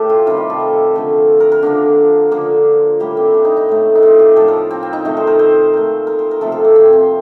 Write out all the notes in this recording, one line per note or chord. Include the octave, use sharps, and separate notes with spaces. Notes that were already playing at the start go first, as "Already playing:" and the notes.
Already playing: A2 A3 G4 A4
F4
C3 D#3 G3 F4
G4
A4
C5
D3 F3 A3
A#4
A#4
D3 F3 A#3 D4
D3 F3 A#3
A2 G3 A#3 G4
C4
D4
D#4
D#4
A2 A3
D#4
F4
G4
A2 F3 A#3 A4
A#4
C4
C4
D#4
C3 D#3 A3 A4
C5
A#4
C5
A#2 A3
A#4
C5
A#4
C3 F3 A3 A4
A4
A#3
C4
C4